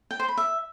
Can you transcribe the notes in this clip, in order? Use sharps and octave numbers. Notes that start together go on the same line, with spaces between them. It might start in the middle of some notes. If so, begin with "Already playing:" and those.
G5
C5
B5
E5